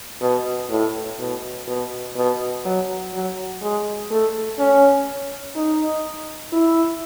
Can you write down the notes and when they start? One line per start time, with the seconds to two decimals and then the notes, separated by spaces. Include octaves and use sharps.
0.21 B2
0.70 A2
1.19 B2
1.68 B2
2.16 B2
2.65 F#3
3.14 F#3
3.62 G#3
4.11 A3
4.59 C#4
5.56 D#4
6.53 E4